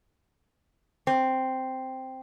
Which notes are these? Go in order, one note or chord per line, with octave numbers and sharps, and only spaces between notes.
C4